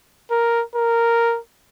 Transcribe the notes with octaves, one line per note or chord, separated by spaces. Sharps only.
A#4
A#4